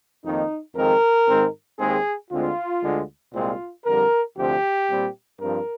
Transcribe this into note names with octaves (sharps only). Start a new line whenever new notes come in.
F2 D#3 A#3 D#4
F2 D#3 G#3 C4 A#4
G#2 D#3 G#3 C4
D#2 D#3 G#3 C4 G#4
D2 D3 G#3 C4 F4
D2 D3 G#3
C2 A#2 G#3 C4 F4
F2 D3 G3 A#4
D2 C3 F3 C4 G4
A#2 G3 C4
G2 F3 C4 A#4